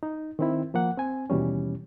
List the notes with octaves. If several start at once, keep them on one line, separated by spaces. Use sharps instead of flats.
D#4
D#3 C4 E4
F3 A#3 F#5
C4 G#5
D#2 B2 E3 G3 C#4